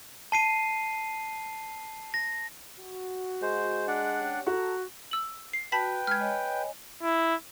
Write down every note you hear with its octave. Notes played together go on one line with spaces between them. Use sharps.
A5 C7 D#7
A#6
F#4
G#3 C5
D4 D5 F#5
C#4 G4
F#4 A4 A#5
E6 F#7
C7
F#4 B4 G5 A5 B5 B6
G#3 F6 G#6
C#5 D#5 G#5
E4